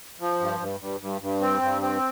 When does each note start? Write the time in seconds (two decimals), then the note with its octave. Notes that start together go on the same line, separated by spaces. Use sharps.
0.20 F3
0.40 G2
0.60 G2
0.80 G2
1.00 G2
1.21 G2
1.41 C4
1.62 G2
1.82 C4